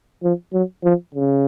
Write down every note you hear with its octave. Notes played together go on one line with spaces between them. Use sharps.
F3
F#3
F3
C#3